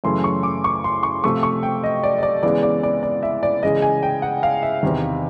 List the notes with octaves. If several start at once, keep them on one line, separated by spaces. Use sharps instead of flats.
F#2 C#3 E3 A3 C6
C#6
D6
C#6
C6
C#6
C3 F3 A3 C#6
C#6
G5
D#5
D5
D#5
D5
C#3 E3 G#3 B3 D5
D5
D5
D5
E5
D5
C#3 E3 G#3 D#5
G#5
G5
F#5
F5
E5
E2 C3 D#3